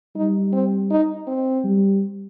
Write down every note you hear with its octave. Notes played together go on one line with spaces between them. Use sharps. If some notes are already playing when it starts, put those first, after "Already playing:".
G3 D#4
C4
D#4
C4
G3